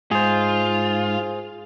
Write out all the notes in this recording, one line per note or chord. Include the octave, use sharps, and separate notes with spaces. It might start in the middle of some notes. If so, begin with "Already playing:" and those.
G#2 F4 G#4 C5